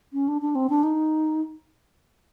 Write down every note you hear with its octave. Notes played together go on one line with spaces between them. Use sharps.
C#4
D4
D4
C4
D4
D#4